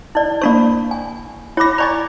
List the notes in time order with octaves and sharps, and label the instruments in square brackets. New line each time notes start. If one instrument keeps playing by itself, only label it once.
[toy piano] E4 D5
[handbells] A#3 D4 C5 [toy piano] D5 B5 C#6
[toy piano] G#5
[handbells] E4 A#6 [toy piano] C#5 B5 D6
[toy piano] C#5 D5 G#5 [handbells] A#5 C#6 A6